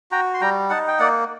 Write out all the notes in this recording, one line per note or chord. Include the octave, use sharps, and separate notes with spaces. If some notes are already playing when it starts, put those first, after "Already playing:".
F#4 G5 A#5
C6
G3 G5 A#5
D#4 F#5 A5
G5
A#3 D5 F#5